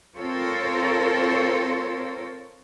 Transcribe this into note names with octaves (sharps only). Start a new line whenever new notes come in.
C4 F4 A4 A#4 C5 C#5